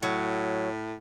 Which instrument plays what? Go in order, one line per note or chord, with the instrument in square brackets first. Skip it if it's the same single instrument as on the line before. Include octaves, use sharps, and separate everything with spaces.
[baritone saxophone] A2 [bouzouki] F#3